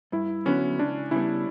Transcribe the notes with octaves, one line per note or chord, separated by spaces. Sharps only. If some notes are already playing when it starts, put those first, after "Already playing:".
G2 E4
D3 F#3 B3 C#4
C#2 D4
C#3 G3 B3 E4